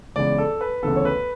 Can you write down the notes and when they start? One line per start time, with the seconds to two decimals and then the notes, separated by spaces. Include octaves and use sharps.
0.16 C#2 C#3 E3 B3 D5
0.38 A4
0.61 B4
0.83 D2 C#3 E3 B3 A4
0.96 C#5
1.05 B4